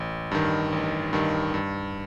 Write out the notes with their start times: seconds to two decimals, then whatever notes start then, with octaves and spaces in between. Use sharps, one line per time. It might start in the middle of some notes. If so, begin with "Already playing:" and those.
Already playing: A1
0.31 G2 D#3
0.72 A1
1.13 G2 D#3
1.54 G2